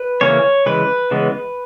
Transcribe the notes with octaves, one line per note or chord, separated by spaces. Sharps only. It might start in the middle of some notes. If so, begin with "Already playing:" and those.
Already playing: B4
C#3 E3 A#3 C#4 C#5
C#3 E3 G#3 B4
C#3 E3 G#3 B3